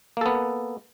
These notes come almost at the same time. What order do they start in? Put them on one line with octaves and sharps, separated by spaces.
A#3 A4 B3